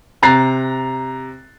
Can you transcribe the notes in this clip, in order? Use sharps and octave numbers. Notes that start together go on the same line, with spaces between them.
C3 A#5 F#6 A6 C7